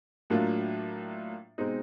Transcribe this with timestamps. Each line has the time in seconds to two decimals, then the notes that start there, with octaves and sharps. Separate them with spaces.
0.30 A2 F#3 A#3 D4 F4
1.58 B2 G#3 C4 D#4